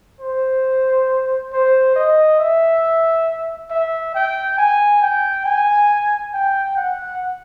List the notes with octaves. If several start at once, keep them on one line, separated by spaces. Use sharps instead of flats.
C5
C5
D#5
E5
E5
G5
G#5
G5
G#5
G5
F#5